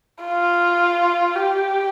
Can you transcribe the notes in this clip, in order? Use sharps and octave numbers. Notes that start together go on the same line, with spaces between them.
F4
G4